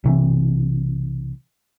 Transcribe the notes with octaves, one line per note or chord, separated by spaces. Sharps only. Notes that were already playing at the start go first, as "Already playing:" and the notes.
B1 C3 E3